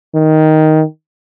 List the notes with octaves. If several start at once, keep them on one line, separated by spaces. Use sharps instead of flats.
D#3